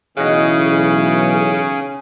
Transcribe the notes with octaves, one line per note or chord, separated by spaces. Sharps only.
B1 C#3 E3 C#4 G#4 D#5 F#5